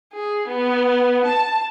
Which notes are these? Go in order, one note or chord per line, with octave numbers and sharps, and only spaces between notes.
G#4
B3
A5